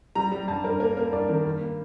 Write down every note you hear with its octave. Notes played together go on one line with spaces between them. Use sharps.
G3 A#5
G3
G2 A5
G2 A#4
A#3 A#4
A#3 A#4
G2 D5
D#3 A#4
G2
A#3